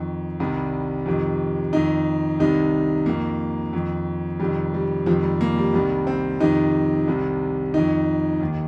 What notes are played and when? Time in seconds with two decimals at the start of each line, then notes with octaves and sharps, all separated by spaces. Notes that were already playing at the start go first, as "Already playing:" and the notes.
Already playing: F2 D#3
0.40 C2 C3 D#3 G3
1.06 F2 C3 D#3
1.73 F2 D#3 D#4
2.40 C2 C3 D#3 D#4
3.06 F2 D#3 A#3
3.73 F2 D#3
4.40 F2 C3 D#3 G3
4.74 G3
5.06 F2 C3 D#3 F3
5.23 G3
5.41 A#3
5.58 G3
5.73 C2 C3 D#3 G3
6.07 C4
6.40 F2 C3 D#3 D#4
7.07 C2 C3 D#3
7.74 F2 D#3 D#4
8.40 D#2 D#3